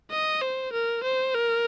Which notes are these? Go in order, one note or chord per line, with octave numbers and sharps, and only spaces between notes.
D#5
C5
A#4
C5
A#4